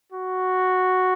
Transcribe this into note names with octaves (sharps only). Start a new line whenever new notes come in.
F#4